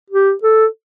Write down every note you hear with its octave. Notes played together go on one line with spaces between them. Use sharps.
G4
A4